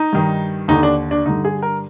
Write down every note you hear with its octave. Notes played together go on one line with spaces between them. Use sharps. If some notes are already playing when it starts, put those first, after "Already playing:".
Already playing: D#4
G2 D#3
D#2 D3 D#4
D4
D4
G2 D3 D#4
G#4
A#4